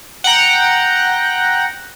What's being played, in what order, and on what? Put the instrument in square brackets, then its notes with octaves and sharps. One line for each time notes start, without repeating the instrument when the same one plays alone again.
[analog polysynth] F#5 G5 A#5